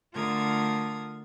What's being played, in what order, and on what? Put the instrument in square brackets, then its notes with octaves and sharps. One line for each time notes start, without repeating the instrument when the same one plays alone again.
[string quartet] D3 A3 F4 A#4 D#6 G#6